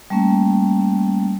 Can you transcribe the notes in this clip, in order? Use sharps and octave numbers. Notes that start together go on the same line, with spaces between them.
G3 A3 A#3 C#4